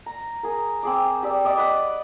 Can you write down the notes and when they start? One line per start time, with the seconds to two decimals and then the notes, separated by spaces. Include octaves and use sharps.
0.06 A#5
0.43 G#4 A#4
0.83 C4 G#4 D6
1.23 G4 D5 E6
1.45 D5 D#5 D6
1.57 B4 F#5